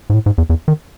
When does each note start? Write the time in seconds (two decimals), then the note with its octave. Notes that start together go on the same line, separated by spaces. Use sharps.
0.10 G#2
0.14 A2
0.26 G#2
0.38 E2
0.50 E2
0.68 D#3